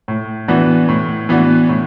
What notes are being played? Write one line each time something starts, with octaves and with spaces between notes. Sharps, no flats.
A2
E3 B3 D4 F#4
A2
E3 B3 D4 F#4
A2